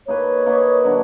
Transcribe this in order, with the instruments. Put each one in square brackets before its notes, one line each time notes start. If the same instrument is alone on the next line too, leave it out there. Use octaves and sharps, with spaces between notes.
[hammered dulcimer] A#3 D#4 G#4 B4 [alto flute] C#5
[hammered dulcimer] A#3 D#4 G#4 B4
D3 F#3 A#3 D4